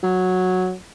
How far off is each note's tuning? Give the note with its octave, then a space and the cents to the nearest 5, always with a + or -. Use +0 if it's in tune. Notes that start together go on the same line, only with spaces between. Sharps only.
F#3 -5